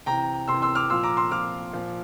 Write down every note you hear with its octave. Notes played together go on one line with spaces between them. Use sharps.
C3 E3 G5 A#5
C3 E3 C6 E6
C6 E6
D6 F6
A#2 F3 C6 E6
A#5 D6
C6 E6
A#2 F3 D6 F6
A#2 F3